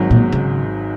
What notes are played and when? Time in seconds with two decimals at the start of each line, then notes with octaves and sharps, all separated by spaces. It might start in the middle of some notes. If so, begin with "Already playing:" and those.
Already playing: G#1 G#2 F#3
0.11 A#2
0.32 C#3